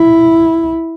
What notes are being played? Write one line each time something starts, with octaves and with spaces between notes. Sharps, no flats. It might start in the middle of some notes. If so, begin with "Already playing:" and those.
Already playing: E4